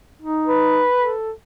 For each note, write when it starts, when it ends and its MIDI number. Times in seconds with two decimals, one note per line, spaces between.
0.22 0.86 63
0.47 1.12 71
0.98 1.31 69